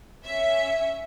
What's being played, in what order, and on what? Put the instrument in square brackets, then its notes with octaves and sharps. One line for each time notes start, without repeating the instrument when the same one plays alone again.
[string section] C#4 E5